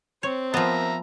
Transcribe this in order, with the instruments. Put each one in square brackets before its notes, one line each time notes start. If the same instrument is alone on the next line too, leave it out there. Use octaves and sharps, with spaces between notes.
[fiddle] C4 [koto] C#5
[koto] F3 B3 [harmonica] A#4 E5 A#5